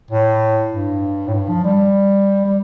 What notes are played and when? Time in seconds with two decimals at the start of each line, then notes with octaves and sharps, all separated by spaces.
0.11 A2
0.72 G2
1.27 A2
1.34 G2
1.49 F3
1.64 G3
2.45 G3